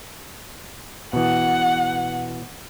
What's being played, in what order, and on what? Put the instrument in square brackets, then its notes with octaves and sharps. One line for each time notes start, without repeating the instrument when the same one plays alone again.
[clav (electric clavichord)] B2 E3 [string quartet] F#5